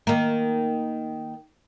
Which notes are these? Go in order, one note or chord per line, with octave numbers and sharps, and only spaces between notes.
D#3 A#3